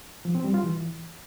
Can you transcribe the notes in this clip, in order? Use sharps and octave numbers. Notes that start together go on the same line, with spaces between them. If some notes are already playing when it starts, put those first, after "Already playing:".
F3
C4
G3
F4
E3